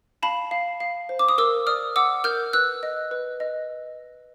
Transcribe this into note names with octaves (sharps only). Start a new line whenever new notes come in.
F5 A5 B5
F5
F5
C5
D6
D#6
A#4 D6 E6
D5 D#6 F6
F#5 D6 E6
A#4 F6 G6
B4 E6 F#6
D#5
B4
D#5